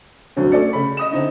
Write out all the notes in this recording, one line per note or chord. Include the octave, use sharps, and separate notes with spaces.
D2 G2 F#3 C4
A3 C#4 A4 D5 A6 C#7
C#3 B5
D#5 D#6 E7
D3 C4 D#4 E4